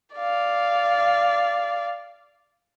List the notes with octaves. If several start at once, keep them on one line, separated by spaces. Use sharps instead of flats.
D5 F5